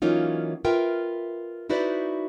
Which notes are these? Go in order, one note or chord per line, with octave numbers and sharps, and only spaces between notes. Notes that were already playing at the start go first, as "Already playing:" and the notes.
E3 F#3 A#3 C#4 D#4 F4
F4 A#4 B4 E5 G5
D#4 E4 F#4 B4 C5 D5